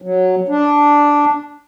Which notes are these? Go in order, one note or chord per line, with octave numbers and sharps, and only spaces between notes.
F#3
D4